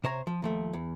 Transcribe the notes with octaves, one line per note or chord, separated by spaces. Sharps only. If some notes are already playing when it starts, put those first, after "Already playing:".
C3 C5 C#5 A#5
F3
D#2 F3 A3
E2